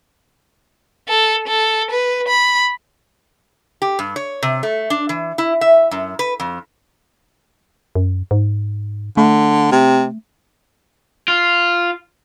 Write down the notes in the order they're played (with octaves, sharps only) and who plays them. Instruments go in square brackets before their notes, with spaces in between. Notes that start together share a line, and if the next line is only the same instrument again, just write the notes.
[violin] A4
A4
B4
B5
[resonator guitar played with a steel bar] G4
G2
C#5
C3
A3
D4
E3
E4
E5
F#2
B4
F2
[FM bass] F#2
G#2
[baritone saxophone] D3 [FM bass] A3
[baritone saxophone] C3
[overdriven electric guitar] F4